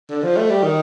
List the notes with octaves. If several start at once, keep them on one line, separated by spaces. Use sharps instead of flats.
D3
F3
A3
G3
D#3